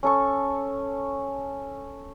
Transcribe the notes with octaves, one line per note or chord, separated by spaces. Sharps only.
C#4 A4 C#6